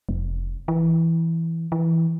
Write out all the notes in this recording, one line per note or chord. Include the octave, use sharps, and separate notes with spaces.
F1
E3
E3